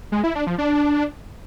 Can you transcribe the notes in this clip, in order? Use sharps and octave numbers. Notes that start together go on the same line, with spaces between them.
G#3
E4
D4
F3
D4